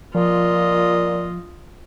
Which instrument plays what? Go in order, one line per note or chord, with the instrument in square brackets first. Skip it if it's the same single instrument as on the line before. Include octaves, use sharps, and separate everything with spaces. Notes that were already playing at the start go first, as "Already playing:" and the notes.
[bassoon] A#2 [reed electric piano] F3 [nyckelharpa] F4 D#5